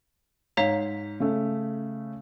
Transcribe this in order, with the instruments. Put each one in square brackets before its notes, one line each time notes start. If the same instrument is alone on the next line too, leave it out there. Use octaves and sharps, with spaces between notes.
[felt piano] G#2 B6 [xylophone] C#5 F5 A#5
[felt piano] C#3 A3